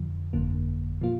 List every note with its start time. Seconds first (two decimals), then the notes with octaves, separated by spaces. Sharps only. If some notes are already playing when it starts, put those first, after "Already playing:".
Already playing: F2 D3 F3
0.33 G1 F2 D3 A#3
1.01 A#2 F3 A#3 F4